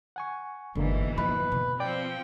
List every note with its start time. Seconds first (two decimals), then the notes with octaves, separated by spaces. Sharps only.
0.16 F#5 G#5 C#6
0.75 G1 F2 G#2 B2 D3 E3 A#3
1.18 F3 B4
1.52 B2
1.80 F3 C4 D5 G5